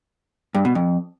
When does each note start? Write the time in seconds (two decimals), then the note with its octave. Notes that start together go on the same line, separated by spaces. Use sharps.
0.54 G2
0.65 B2
0.75 F2